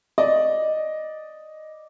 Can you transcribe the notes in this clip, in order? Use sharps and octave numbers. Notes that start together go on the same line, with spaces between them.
D5 D#5